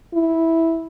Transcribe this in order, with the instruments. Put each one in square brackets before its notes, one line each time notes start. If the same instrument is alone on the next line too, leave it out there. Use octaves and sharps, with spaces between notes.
[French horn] E4